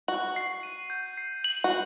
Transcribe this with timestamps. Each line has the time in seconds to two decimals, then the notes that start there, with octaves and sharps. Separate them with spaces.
0.08 F#4 F#7
0.36 C7
0.63 D#7
0.90 G6
1.18 C7
1.44 F#7
1.64 F#4